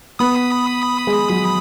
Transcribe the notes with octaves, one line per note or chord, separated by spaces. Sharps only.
B3 B5 D#6
G#3
F#3